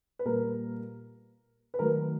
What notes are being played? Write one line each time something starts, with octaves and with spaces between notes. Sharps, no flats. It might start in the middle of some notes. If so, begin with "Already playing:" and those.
B4
A#2 G3 A#3 A#4
B4
D#3 F#3 A3 A#4